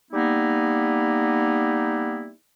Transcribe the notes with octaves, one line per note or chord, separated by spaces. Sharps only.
G3 A#3 B3 D#4 E4